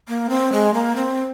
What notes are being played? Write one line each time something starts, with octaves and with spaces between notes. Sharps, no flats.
A#3
C4
G#3
A#3
C4